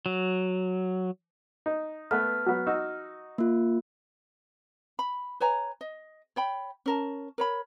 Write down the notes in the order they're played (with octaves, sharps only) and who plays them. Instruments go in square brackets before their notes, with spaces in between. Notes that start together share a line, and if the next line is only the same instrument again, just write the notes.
[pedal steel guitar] F#3
[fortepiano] D#4
[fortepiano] A3 B3 B4 [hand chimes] F6
[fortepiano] F#3 B3
D#4 F#4 E6
[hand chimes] A#3 F4
[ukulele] B5
B4 C#5 G#5 A#5
D#5
C#5 G5 B5
C#4 A#4 A5
A#4 C#5 B5